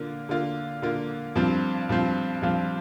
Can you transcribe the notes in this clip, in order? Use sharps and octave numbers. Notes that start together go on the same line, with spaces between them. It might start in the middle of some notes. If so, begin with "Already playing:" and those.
Already playing: D3 A#3 F4
D3 A#3 F4
D3 A#3 F4
G2 F3 C4 F4
G2 F3 C4 F4
G2 F3 C4 F4